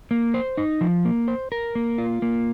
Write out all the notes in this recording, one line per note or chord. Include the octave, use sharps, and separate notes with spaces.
A#3
C5
D#4
F3
A#3
C5
A#4
A#3
F4
A#3